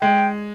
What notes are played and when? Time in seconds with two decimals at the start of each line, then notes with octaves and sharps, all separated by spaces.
0.01 G#3 G5